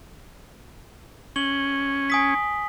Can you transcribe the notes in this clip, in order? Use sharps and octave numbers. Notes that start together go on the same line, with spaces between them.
C#4 F#7 G7
G#5 D#6 B6